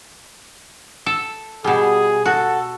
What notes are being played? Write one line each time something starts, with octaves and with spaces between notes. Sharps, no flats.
A4
B2 G3 G#4
F#4 A4